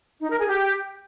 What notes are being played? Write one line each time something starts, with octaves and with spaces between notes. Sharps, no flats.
D#4
A#4
G#4
G4